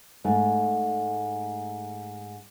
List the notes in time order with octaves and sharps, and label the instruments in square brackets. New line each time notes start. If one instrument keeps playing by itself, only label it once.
[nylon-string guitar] G#2 A3